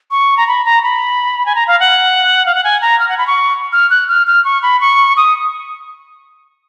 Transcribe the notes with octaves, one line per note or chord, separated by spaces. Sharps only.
C#6
A#5
B5
A#5
B5
G#5
A#5
F5
F#5
F5
F#5
G#5
A#5
F6
F#5
B5
C#6
F6
F#6
F6
F6
C#6
B5
C#6
D#6